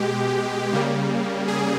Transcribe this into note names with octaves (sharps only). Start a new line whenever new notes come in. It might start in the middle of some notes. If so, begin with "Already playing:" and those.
Already playing: B2 G#3 G4
C#3 G3 A#3
G#4